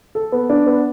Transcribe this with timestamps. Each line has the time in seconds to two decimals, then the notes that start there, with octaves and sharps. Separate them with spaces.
0.15 A4
0.32 B3
0.50 D4
0.66 B3